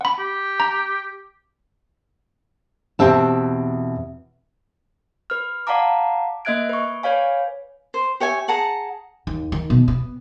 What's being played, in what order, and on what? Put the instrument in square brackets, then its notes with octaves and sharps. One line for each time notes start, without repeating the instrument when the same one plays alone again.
[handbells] F#5 B5
[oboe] G4
[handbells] A#5
[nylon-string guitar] E2 B2 C4 G4 E5 A5
[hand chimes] B4 F6
D5 F5 F#5 A5 A#5 D6
A#3 D#5 E5 F#6 G#6 D7
B4 C#6
B4 C#5 D5 F5 G#5
[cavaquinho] C5
G4 C#5 E5 G#5
G#4 F#5 A5 A#5
[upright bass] D#2
D#3
B2
B3